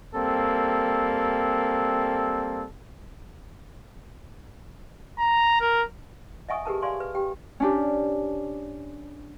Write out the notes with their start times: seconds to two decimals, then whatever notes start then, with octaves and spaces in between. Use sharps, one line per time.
0.15 G3 A#3 C4 A4
5.18 A#5
5.60 A#4
6.49 D#5 E5 F#5 G#5 C#6 D#6
6.65 G4 G#4 A#4 B4 F#5 A5
6.82 D5 F5 G#5 C6 C#6
7.00 B4
7.15 G4 G5
7.60 C#4 D4 G4